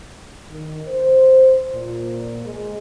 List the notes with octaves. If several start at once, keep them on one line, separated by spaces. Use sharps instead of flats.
D#3
C5
A#2
G#3